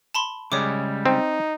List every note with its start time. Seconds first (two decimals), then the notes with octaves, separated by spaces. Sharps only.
0.15 A5 B5 C6
0.52 C#3 G3 G#3 C#5 D6
1.06 C4 D#4